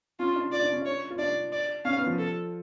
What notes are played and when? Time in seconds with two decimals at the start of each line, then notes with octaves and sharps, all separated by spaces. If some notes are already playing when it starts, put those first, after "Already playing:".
0.19 C#4 F4
0.36 D4
0.52 F4 D5
0.63 D4
0.73 C#4
0.82 D4 C#5
1.10 F4
1.19 D4 D5
1.52 D5
1.85 C#4 F5
1.97 B3
2.07 F3
2.18 A4